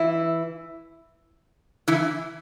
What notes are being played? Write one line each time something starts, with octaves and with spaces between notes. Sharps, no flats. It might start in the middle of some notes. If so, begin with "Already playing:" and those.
Already playing: E3 E4
E3 E4